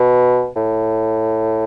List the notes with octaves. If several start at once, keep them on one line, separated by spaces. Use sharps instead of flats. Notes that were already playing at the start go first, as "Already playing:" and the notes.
Already playing: B2
A2